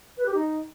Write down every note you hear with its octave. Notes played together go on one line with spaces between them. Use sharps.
B4
G4
D#4